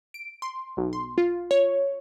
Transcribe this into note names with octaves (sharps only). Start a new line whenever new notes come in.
D7
C6
B1
C6
F4
C#5